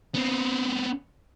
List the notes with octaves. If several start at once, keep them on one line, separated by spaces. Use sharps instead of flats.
B3 C4